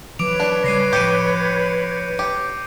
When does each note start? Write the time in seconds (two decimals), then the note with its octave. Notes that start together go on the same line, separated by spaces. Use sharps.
0.19 E3 F#3 B4 C#5 D6 D7 F7
0.40 D4
0.64 C#3 G3 A#6 C7 D#7
0.93 A2 F3 G4 G6 C#7 D#7
2.19 G4